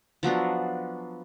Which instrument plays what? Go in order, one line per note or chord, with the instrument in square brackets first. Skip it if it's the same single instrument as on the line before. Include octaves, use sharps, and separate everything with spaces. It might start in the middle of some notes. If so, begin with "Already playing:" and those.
[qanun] F3 F#3 B3 D4